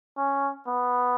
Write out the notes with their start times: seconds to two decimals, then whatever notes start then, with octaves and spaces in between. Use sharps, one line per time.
0.18 C#4
0.67 B3